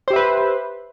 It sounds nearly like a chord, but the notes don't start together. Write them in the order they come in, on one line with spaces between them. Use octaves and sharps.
C5 G4 E5 B4